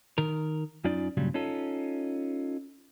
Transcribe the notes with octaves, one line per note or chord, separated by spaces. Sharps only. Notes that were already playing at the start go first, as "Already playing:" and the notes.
D#3 A#4
F#2 C#4 D#4 F4 D5
G2 A#2 C#3 F#3 G3
C#4 D#4 F4 A4